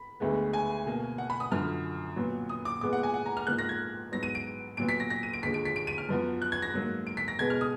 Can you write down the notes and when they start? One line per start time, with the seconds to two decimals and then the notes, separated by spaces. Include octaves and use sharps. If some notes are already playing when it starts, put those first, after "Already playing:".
Already playing: B5
0.20 D2 D3 G#3 B3
0.53 G#5
0.86 B2 A#3
1.18 F#5
1.30 B5
1.40 D#6
1.51 F#2 D3 F3 F6
2.16 A#2 F#3 B3
2.49 D#6
2.65 D6
2.81 A#2 G#3 B3 D6
2.93 F#5
3.03 G#5
3.14 F#5
3.26 A#5
3.37 F6
3.47 G#2 F3 A#3 F#6
3.59 A#6
3.69 G#6
4.12 G#2 F#3 B3 A#6
4.23 D#7
4.35 D7
4.77 A#2 F#3 B3 D7
4.89 B6
5.00 A#6
5.10 A#6
5.23 D#7
5.33 D7
5.43 D#2 D3 F3 G#3 B6
5.54 D7
5.65 B6
5.76 D7
5.87 D#7
5.98 F6
6.09 F#2 F3 B3
6.42 F#6
6.52 G#6
6.62 A#6
6.74 G#2 F#3 A#3
7.07 D7
7.17 B6
7.28 A#6
7.39 B2 G#3 B3 G#6
7.50 F6
7.61 D#6